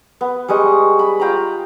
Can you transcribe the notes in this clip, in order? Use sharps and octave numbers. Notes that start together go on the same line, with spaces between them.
B3
G3 G#3 D#5 C#6
B5
F4 G5 A#5 B5